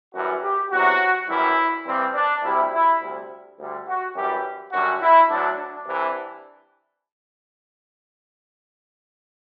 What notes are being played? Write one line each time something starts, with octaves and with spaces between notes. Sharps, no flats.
F#2 E3 G3 F#4
G4
E2 C3 F#3 F#4
F#2 E3 G3 E4
G2 E3 G3 C4
D4
D2 C3 G3 E4
E4
D2 C3 G3
D2 D3 G3
F#4
F#2 E3 G3 G4
F#2 D3 G3 F#4
E4
D2 D3 F#3 D4
D4
C2 C3 E3